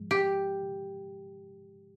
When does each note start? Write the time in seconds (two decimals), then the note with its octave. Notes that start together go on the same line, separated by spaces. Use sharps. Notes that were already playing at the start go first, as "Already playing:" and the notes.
Already playing: G#2 F3 G#3
0.11 G4